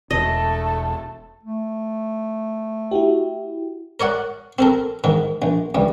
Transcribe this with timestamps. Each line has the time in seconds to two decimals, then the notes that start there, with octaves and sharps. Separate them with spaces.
0.11 E1 A3 A4 D#5 A5
1.43 A3
2.91 E4 F#4 G4
4.00 A#4 C#5 D5 F#5
4.59 C4 A4 A#4
5.04 G#2 D#3
5.42 A#1
5.75 C#2 G3